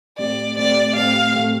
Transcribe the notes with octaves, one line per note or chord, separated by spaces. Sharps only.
A2 A3 C4 G4 D5
A2 A3 C4 G4 D5
A2 A3 C4 G4 F5
A2 A3 C4 G4